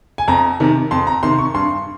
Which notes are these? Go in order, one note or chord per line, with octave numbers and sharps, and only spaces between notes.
G#5
F2 A#5
C3 D#3
F2 C6
A#5
C3 D#3 C6
C#6
G2 C6